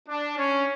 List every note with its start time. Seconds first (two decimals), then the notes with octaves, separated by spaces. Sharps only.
0.09 D4
0.38 C#4